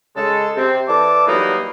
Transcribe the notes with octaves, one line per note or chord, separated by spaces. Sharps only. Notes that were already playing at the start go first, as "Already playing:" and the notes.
C#3 G#3 A4
C3 C4
E3 A4 D5 A5 D6
E3 F#3 G3 A#3 B3 D#4